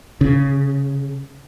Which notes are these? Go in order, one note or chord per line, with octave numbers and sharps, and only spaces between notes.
C#3